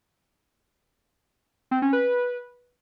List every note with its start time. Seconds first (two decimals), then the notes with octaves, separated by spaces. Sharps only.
1.71 C4
1.82 C#4
1.93 B4